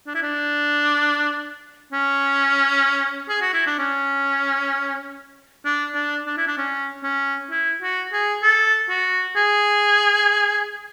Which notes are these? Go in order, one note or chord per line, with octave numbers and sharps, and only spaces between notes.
D4
E4
D4
C#4
G#4
F#4
E4
D4
C#4
D4
D4
D4
E4
D4
C#4
C#4
E4
F#4
G#4
A4
F#4
G#4